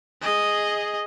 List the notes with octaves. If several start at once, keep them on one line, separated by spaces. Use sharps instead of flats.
G#4 D#5